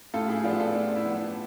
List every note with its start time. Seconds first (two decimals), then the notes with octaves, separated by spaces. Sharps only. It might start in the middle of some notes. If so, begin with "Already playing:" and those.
0.14 A2 F4 A4
0.28 E4 G#4
0.43 F3 B3 D4 F4
0.59 F4 A4
0.75 A2 D4 F4
0.96 E4
1.06 F3 B3
1.16 D4